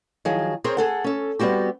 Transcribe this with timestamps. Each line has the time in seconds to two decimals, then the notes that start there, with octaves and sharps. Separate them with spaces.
0.25 D#3 F3 F#3 G#4
0.64 C4 G#4 A#4 C5 C#5
0.77 G#4 A4 F#5
1.04 C#4 A4
1.39 G3 B3 C4 F#4 G4